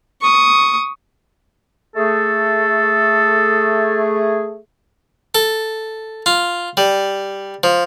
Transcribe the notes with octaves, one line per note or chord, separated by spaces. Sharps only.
C#6 D#6
A3 G#4 A4
A4
F4
G3
F3